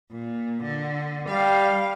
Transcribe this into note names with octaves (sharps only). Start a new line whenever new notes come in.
A#2
D3
G3 F5